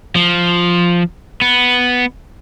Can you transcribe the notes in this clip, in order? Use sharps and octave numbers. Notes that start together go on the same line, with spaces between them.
F3
B3